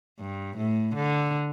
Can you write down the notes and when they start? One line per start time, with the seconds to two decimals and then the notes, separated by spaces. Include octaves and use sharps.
0.20 G2
0.57 A2
0.95 D3